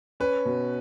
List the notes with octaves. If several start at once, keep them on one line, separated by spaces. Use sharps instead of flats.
C#4 B4
B2